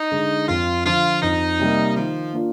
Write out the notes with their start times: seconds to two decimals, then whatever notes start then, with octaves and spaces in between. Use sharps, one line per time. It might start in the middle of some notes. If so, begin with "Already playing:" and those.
Already playing: D#4
0.11 D3 G#3
0.48 F2 F4
0.85 D3 F3 F4
1.22 F2 D#4
1.59 C3 G3 A#3
1.96 D#3 F3
2.33 A#3 D4 F4